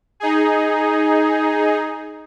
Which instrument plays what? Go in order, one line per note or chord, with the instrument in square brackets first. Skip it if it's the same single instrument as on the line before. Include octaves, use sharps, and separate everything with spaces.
[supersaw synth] D#4 G#4